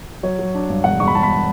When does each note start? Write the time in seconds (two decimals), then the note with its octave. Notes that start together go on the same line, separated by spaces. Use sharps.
0.23 F#3 C#5
0.39 F#3
0.55 D4
0.69 G2
0.84 E1 F#5
1.00 E1 C#6
1.07 B5
1.15 E1 A5
1.23 B5